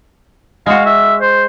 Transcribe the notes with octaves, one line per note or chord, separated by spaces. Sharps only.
G#3 F#4 F5
E5
C5